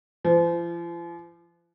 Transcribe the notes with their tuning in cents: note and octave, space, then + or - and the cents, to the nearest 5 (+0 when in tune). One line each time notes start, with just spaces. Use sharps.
F3 -40